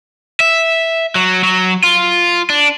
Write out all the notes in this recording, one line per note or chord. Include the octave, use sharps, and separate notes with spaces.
E5
F#3
F#3
F4
D4